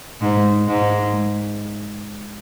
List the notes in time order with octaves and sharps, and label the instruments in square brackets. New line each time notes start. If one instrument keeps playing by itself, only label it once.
[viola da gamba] G#2 [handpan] D#4
[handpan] G#3
D#4
[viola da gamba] G#2 [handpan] D#4
[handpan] D#4
D#4
G#3